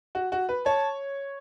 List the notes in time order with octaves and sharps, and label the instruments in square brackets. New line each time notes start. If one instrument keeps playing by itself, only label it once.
[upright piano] F#4
F#4
B4
[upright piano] C#5 [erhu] A5